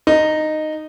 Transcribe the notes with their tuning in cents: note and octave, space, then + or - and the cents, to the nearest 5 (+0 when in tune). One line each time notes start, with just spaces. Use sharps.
D#4 -10